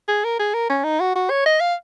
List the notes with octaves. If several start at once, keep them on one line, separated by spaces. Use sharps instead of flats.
G#4
A#4
G#4
A#4
C#4
D#4
F#4
F#4
C#5
D#5
F5